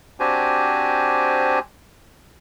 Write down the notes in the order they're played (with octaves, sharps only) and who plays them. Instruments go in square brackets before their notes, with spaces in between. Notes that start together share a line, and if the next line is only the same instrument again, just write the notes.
[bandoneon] C4 D4 F#4 G4 C5 G#5